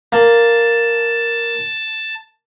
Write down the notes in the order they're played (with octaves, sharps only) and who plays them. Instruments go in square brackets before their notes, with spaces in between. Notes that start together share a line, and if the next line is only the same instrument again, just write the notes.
[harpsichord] A#3 [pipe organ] A5